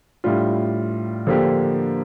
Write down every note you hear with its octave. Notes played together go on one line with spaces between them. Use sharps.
A2 G3 D4 F4
D3 F3 A#3 D4 G4